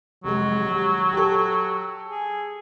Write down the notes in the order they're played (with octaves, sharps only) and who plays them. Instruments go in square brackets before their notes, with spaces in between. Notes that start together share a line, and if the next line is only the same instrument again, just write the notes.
[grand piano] F1 G#3 [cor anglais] F#3
[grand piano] D#1
G4 A4
[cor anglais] G#4